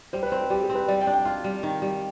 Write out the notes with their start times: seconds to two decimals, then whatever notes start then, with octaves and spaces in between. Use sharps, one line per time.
0.13 G3 C5
0.23 B4
0.32 C4 C5
0.41 B4
0.50 G3 G4
0.63 G#4
0.69 C4
0.75 B4
0.88 G3 D5
1.01 G5
1.07 D4
1.13 G5
1.25 F4 F5
1.44 G3
1.63 D#3
1.82 G3